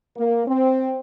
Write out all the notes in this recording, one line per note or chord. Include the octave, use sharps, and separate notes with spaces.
A#3
C4